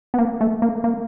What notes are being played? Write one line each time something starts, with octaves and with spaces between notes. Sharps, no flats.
B3
A#3
A3
A#3
A#3